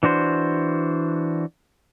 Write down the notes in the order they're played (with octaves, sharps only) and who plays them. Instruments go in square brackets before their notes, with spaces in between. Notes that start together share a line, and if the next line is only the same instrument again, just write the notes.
[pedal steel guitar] E3 D4 F#4 C5